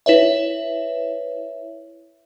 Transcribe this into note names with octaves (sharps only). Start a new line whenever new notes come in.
E4 B4 C#5 E5